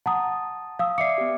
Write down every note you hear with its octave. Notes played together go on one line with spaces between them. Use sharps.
F#5 A5 A#5 D#6
F5 D#6 E6
D5 E5 D6 C7 C#7
B3 G4